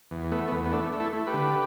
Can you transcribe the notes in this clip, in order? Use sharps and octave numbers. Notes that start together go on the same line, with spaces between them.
E2
A3 B3
B3
E2
B3
A3 D4
A3
E4 A4
A3
G4 B4
D3